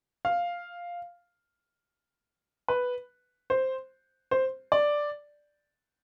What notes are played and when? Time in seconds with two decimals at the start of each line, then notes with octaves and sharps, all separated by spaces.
0.25 F5
2.68 B4
3.50 C5
4.31 C5
4.72 D5